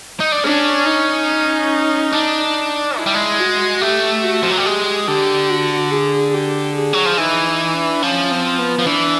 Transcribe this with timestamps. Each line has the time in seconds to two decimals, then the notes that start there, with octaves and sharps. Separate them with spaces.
0.20 D#4
0.32 D4
0.44 C#4 D4
0.86 D#4
2.12 D4
2.97 G#3 E4
3.06 G3
3.15 G#3
3.39 F#4
3.81 A3 G4
4.23 F#4
4.43 F3
4.50 F#3
4.58 G3
4.66 G#3 G4
5.07 D3 G4
5.50 F#4
5.92 G#4
6.34 G4
6.76 G#4
6.93 F#3
7.06 F3
7.18 E3 D#4
7.46 D#4
7.74 D4
8.02 F3 C#4
8.31 C4
8.59 B3
8.79 F3
8.86 E3 D4